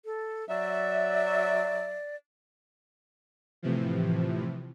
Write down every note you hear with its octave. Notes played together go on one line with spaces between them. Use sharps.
A4
F#3 D5 E5
A2 C3 E3 F3